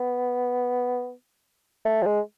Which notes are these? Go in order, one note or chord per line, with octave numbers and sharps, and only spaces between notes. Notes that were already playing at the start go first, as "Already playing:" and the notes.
Already playing: B3
A3
F3
G#3